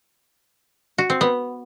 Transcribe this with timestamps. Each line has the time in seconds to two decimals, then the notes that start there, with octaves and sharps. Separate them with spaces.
0.98 F#4
1.10 C4
1.21 B3